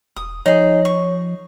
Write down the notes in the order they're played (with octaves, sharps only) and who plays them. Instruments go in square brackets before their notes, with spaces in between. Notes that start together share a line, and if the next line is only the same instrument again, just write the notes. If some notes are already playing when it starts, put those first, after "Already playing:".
[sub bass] E1 [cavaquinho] D#6
[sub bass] F3 [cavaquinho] D#4 G#4 [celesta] C#5
[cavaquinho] C#6